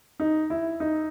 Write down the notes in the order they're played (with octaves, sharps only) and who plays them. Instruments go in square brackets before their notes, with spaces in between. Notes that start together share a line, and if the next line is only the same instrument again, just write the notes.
[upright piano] D#4
E4
D#4